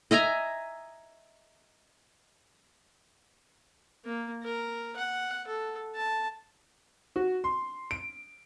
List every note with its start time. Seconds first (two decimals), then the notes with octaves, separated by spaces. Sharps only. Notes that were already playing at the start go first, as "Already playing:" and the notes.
0.11 D#5 E5 G#5 A#5
4.04 A#3
4.43 A#4
4.96 F#5
5.48 A4
5.95 A5
7.16 F#4
7.44 C6
7.91 D7